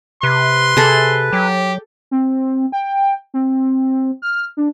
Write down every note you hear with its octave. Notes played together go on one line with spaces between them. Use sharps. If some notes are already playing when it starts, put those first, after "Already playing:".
C3 B4 C6
C3 G#4 A4
F#3 G4
C4
G5
C4
F6
D4